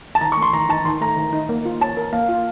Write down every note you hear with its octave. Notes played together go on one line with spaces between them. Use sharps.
A5
D#3 A#5
C#6
A3
C6
D#3 A#5
D#4 A5
D#3 C6
A3 A#5
D#3
D#4
A#3
F4
C#5 A5
A#4
A#3 F5
F4